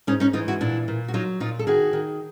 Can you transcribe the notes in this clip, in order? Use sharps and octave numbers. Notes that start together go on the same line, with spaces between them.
G#2 C#4 D#4
C#4 D#4
E3 D#4 F4
E4 F#4
A#2 D4 E4
A#2
F#4
F#3 D#4 F4
A#2 D#4 F4
A4
D#3 F#4 G#4
D#3